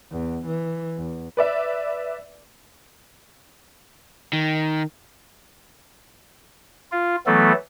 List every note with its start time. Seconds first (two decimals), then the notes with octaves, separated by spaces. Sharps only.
0.11 E2
0.47 E3
0.97 E2
1.37 B4 D5 E5
4.33 D#3
6.92 F4
7.26 E3 F#3 A3 B3 A4